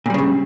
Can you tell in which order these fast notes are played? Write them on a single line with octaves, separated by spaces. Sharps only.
A#2 G3 C#3 G2